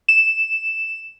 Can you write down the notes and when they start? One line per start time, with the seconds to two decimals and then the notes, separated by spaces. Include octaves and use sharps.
0.08 E7